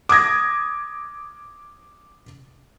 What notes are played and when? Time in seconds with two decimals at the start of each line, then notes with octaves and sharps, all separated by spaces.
0.09 D6 D#6 G#6 A#6